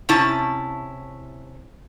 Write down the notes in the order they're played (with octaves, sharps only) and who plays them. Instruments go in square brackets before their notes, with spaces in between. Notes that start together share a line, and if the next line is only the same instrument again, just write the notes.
[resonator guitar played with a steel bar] C3 C#4 E4 A5